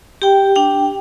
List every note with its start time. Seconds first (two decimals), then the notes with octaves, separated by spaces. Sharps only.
0.22 G4 G5
0.56 D4 G5